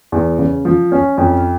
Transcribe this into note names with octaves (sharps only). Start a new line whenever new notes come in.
E2
C#3
F3
C#4
F2